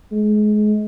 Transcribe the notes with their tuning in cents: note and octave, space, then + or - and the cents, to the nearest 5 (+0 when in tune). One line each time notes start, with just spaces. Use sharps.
G#3 +30